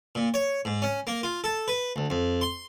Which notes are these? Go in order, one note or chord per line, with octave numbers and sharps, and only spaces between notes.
A#2
C#5
G#2
C#4
A#3
F4
A4
B4
D2
F2
C6